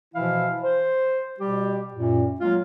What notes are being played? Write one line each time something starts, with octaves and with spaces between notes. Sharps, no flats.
B2 E3 F3 E4 F5
C5
B2 G3 G4
F#2 A#2
F#3 G#3 A#3 F4